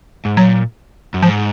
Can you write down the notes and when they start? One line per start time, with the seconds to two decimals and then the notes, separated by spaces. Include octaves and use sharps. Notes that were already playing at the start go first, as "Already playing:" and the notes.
0.25 G#2
0.37 A#2 F#3
1.14 F#2
1.22 G#2 F3